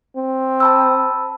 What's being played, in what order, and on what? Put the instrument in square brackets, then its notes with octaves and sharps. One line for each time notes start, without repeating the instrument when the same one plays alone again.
[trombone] C4
[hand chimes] A5 B5 E6